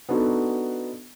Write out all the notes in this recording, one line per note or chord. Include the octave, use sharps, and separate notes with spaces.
B3 D4 D#4 F#4 A4